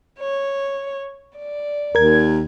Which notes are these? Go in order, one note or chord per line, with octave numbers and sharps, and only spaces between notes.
C#5
D5
D#2 A#4 G#6